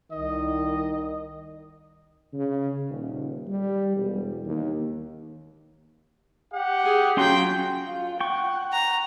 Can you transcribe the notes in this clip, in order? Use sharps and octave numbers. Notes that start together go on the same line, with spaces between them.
C2 D#3 D#5
C#3
D#1
G3
E1
D#2
G4 F#5
G#4
F#3 C#4 F4 G5 C6
F4
F#5 G5 C#6
A#5